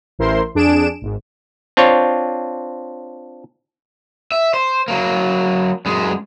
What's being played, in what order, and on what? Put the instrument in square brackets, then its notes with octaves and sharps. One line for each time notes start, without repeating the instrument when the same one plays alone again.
[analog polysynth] A1 E3 E4 A#4 C5 C6
F2 D4 G#4 D7 E7
G#1 G#2
[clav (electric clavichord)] C4 D4 F4 C#5
[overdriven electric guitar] E5
C5
F#3 A#3
F#2 G#3